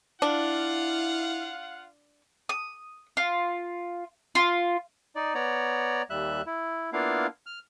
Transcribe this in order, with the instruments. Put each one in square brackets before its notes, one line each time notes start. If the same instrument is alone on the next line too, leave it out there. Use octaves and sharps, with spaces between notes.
[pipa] D4 [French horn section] E4 [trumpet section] F4 F5 F#5
[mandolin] D#6
F4
F4
[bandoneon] D#4 D5
B3 C#5 D5 A#5
D#2 G3 E5 F#6
E4
A#3 B3 D4 E4 F4 F5
F6